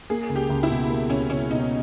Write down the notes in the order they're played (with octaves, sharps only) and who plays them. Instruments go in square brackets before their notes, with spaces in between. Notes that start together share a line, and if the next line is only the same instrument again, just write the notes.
[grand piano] A#3 [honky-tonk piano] G#4
[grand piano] C#2
[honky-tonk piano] G4
[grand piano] C#2
[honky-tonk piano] E4
[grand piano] B2
A#3
[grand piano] C#2 [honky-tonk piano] C#4
[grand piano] C#2 [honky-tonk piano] C#4
[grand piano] B2 [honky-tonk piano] D#4